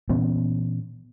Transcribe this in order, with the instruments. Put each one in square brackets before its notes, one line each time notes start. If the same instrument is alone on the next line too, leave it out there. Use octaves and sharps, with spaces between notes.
[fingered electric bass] A#2 E3 B3 C#4